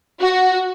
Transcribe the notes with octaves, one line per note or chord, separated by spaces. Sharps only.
F#4